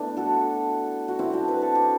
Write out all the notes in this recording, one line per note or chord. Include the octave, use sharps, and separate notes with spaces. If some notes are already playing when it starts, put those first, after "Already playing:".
Already playing: A3 B3 D4 E4
F#4 A4
F#4
C4 E4
D4 F#4
B4
A4
G4